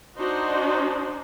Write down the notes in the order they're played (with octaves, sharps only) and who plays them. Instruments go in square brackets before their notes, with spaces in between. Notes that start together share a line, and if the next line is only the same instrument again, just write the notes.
[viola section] D4 D#4 F#4 C5